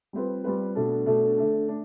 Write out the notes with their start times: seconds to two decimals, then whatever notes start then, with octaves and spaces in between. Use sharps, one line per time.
0.13 G3 C4 F4 B4
0.44 G3 C4 F4 B4
0.75 B2 A3 D4 A4
1.06 B2 A3 D4 A4
1.37 D3 A3 D4
1.68 A3 D4